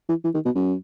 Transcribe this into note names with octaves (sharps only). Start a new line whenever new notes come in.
E3
E3
D#3
B2
F#2